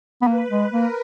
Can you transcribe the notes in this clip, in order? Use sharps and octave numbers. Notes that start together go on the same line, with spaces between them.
B3
A#3 B4
G#3
A#3 A#4